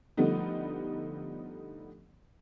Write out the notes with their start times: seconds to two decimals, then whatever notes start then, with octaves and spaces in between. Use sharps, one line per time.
0.17 D3 F3 G3 A3 B3 D#4